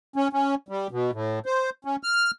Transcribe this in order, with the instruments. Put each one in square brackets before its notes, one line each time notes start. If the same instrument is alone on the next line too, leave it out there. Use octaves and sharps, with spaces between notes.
[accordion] C#4
C#4
G3
B2
A2
C5
C#4
F6